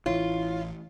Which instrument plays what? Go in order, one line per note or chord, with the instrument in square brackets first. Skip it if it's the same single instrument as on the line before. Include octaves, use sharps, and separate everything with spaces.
[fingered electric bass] A1 E3 [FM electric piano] E4 C#5 [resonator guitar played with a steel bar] F4